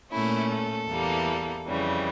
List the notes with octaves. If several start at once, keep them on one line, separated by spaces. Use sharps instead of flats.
A#2 A3 C#4 E4
A4
E2 E3 G3 A#3
F2 C#3 E3 G3